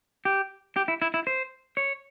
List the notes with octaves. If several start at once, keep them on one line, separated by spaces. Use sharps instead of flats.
G4
G4
E4
E4
E4
C5
C#5